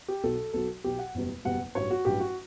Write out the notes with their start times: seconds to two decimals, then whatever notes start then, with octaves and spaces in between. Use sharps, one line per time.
0.08 G4
0.23 B1 B2 F#3 A4
0.53 B1 B2 F#3 A4
0.84 B1 B2 F#3 G4
0.99 F#5
1.14 F#1 E2 B2 G3
1.45 F#1 E2 B2 G3 F#5
1.75 A1 G2 F#3 C#5
1.90 F#4
2.05 A1 G2 F#3 G4
2.20 F#4